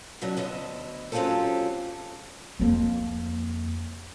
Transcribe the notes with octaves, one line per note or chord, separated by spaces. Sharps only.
B2 F#3 C#4 D4 F#4
D2 B3 D#5 E5
F#3 C4 C#4 F4 G4 A4
F2 A#3